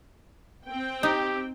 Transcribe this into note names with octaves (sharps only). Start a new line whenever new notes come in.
C4 G5
D#4 G4